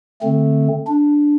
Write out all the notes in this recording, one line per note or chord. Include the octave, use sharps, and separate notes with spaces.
D3 A3 C4
D4